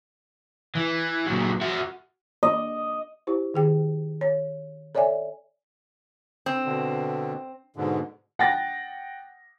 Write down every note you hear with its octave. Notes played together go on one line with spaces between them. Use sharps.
E3
A#2 F#3
F#4 E5
D#5
E4 G4 C5
D#3 G#4 G5
C#5
A4 C#5 D5 E5 G#5
C4
B2 D3
G#2 B2 D3
F#5 G5 A6 A#6